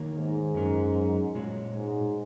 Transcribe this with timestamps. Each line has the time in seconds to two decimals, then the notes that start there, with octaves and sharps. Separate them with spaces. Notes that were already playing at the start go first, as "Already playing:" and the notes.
Already playing: D#3 A#3 D#4 A#4 C#5
0.15 G#2
0.54 F#2 F#3 C#4 A#4
1.35 A#2 G#3 F#4 C#5
1.74 G#2